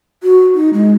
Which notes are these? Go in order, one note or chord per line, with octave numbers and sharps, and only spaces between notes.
F#4
D#4
G#3